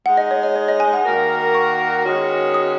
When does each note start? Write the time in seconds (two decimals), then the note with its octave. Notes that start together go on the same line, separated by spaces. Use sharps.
0.05 G#3 D#4 G#4 F#5
0.17 D#5
0.31 C#5
0.43 D#5
0.56 C#5
0.68 D#5
0.80 G#5
0.93 F#5
1.05 D#3 A#3 F#4 A#4
1.54 C#6
2.04 D#3 G#3 C#4 F#4
2.54 D#6